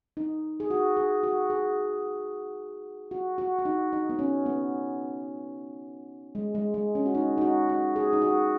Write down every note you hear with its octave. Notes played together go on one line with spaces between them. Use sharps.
D#4
G#4
F#4
G#4
F#4
G#4
F#4
F#4
F#4
D#4
D#4
B3
C#4
B3
G#3
G#3
G#3
C#4
F#4
D#4
D#4
F#4
F#4
G#4
D#4
F#4